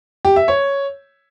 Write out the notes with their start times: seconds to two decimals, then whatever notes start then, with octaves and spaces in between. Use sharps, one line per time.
0.25 G4
0.36 E5
0.48 C#5